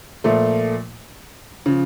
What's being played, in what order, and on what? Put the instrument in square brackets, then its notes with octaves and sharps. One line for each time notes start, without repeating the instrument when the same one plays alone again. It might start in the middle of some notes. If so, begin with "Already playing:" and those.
[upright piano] A#2 F3 A3
C#3 F3